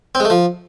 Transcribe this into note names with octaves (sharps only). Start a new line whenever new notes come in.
C4
G#3
A3
F3